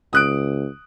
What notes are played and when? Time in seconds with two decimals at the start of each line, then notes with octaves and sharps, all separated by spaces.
0.13 C#2 D#6 F#6 D7